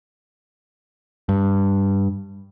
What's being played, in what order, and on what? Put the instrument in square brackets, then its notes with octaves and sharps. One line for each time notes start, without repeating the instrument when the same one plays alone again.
[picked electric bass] G2